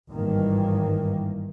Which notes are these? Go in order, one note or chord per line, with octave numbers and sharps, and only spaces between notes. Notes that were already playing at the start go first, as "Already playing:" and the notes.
G#1 G2 D#3 E3 A#3